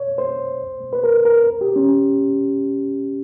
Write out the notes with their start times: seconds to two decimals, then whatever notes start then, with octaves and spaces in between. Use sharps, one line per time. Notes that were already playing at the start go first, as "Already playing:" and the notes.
Already playing: C#5
0.18 C5
0.93 B4
1.04 A#4
1.25 A#4
1.61 G4
1.76 C#4